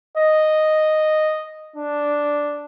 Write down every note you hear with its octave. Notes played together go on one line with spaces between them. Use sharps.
D#5
D4